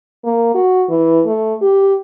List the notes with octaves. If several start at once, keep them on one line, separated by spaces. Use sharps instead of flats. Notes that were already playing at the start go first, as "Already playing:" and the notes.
A#3
F#4
E3
A3
G4